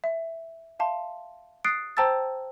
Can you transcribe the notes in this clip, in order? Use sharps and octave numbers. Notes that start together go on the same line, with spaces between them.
E5
E5 F5 A5 C6
D#6 F#6 A6 C7 D7
C5 G5 A5 A#5 E6 A6